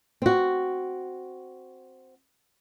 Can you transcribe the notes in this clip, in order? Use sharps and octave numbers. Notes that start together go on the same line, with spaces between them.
C4 F#4